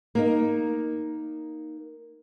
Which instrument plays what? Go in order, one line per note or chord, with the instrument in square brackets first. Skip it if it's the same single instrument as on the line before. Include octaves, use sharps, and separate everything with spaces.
[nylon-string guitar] A#3 D#4